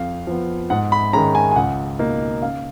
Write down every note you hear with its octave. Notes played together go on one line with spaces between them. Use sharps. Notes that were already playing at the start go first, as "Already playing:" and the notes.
Already playing: F2 F5
F3 B3
G#2 F#5
B5
D#3 G#3 C#4 A#5
G#5
G#5
C#2 F#5
B2 A#3 D#4
C#3 F5